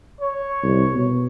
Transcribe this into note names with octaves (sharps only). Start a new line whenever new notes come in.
C#5
C2
B2